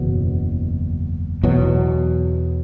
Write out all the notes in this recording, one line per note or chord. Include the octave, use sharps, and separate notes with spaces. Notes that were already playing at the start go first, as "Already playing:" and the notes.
Already playing: F#1 E2 B2 F#3
E2 B2 F#3